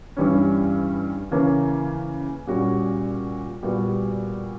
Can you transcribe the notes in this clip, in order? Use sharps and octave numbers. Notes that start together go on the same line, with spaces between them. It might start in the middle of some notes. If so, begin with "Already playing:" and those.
G2 E3 G3 C#4
C#3 E3 A#3 C#4
A#2 G3 C#4 F#4
A#2 G3 B3 F#4